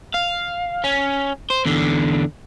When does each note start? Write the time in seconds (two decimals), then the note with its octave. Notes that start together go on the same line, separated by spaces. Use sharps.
0.14 F5
0.84 C#4
1.50 C5
1.66 E2 D3